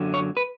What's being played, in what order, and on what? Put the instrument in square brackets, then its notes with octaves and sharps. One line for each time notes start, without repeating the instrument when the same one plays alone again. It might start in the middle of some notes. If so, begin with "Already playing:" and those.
Already playing: [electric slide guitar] F#2 D3 F#3
C#5
B4